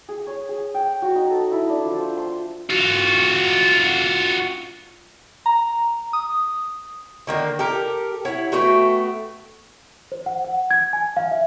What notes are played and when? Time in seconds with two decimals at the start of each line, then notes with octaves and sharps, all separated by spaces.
0.09 G#4
0.27 C#5
0.49 G#4
0.74 G5
1.02 F#4
1.16 D#4
1.30 A4
1.52 E4
1.69 D4
1.85 F3
1.97 C5
2.17 C6
2.70 F4 F#4
5.46 A#5
6.13 D#6
7.27 D3 D#3 A#3
7.59 G4 A4 A#4
8.25 E4 C#5 F#5
8.52 A3 B3 F#4 G5
10.12 C5
10.26 F#5
10.44 F#5
10.71 G#6
10.93 G#5
11.17 F5
11.32 E5